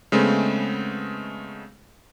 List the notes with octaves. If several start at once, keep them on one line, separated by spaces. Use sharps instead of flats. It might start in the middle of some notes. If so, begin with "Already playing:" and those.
C#3 G#3 A3 B3 C4